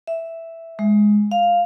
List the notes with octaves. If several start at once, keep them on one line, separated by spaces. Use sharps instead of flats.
E5
G#3
F5